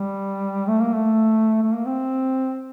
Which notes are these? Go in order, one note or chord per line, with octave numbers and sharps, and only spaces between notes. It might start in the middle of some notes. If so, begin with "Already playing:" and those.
Already playing: G3
A3
A#3
A3
A3
A#3
C4